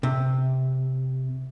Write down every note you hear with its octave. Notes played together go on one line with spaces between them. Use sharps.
C3